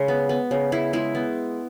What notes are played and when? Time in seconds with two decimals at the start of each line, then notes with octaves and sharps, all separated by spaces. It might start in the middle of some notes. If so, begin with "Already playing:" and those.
Already playing: C#3 G#3
0.08 B3
0.29 B3
0.51 C#3
0.72 C#3 E4
0.93 G#3 E4
1.15 B3